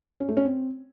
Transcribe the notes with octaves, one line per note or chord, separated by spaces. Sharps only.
C#4
A3
C#4
C4